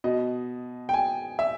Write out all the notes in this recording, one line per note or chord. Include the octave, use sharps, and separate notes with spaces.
B2 D#5
G5
G#5
E5